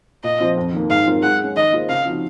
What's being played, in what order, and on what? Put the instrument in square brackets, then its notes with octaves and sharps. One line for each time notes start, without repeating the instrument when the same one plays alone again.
[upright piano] A#2 [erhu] D#5
[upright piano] F3 C4 F4 C5
F2
D#3 A#3
[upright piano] G#2 [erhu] F5
[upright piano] F#3 C4 F4 A#4
[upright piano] G#3 [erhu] F#5
[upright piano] C#4 G#4
[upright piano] D#3 [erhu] D#5
[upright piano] A#3 F4 G#4 C5
[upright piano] C#3 [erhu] F5
[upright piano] F3 C4 D#4 F#4